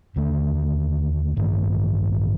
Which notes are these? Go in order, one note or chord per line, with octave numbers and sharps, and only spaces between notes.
D#2 D3 A3
A1 G2 D#3 A3